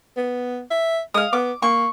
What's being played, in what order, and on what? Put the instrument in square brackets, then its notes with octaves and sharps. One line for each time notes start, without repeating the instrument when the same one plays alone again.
[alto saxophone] B3
E5
[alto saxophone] G#3 [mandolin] F5 D#6
[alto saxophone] B3 [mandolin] D6
[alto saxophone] A#3 [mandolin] C#6